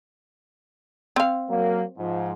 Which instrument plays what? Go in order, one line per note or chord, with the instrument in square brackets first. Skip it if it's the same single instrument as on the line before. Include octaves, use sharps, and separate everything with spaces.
[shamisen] C4 F5
[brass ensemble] F#3 A#3
G#2 F3